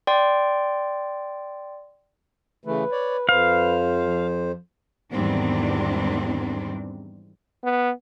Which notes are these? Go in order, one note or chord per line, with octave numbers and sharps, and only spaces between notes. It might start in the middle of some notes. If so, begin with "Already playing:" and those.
D5 G5 C6
C#3 E3 A3 B4
C#5 D5
F2 B4 C5 F5
F3
E2 G#2 D#3 G3 C4 D4
B3